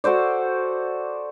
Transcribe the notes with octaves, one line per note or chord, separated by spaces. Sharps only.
F#4 A4 C5 D5